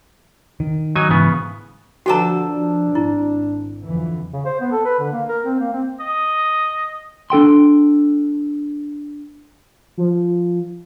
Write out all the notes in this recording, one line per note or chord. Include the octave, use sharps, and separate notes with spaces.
D#3
F#3 D#4 G#5
G#2 C#3 E3 B3
D3 F3 B3 F#4 G4 A4 A#5
D4
G#1 E4
F2 D3 E3
C#3
C5
B3
A4
B4
D3
A#3
A#4
C4
A#3
C4
D#5
D4 A4 G5 C6
F3